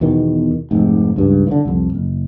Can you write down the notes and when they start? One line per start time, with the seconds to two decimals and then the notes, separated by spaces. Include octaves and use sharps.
0.01 E2 B2 D#3
0.71 F1 G#2
1.16 C#2 G2
1.47 D3 E3
1.65 C2 F2
1.95 F#1